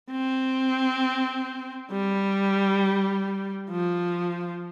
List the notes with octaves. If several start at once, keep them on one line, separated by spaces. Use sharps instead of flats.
C4
G3
F3